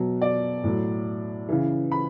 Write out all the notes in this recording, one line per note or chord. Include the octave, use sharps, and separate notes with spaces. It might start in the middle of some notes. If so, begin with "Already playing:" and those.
Already playing: B2 F#3
D5
A2 F#3
C#3 E3
B5